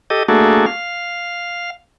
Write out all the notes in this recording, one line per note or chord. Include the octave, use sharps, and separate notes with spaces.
G4 A4 D#5
A3 A#3 D4 F#4 G#4 A4
F5